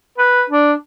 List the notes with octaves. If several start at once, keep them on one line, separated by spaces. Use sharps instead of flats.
B4
D4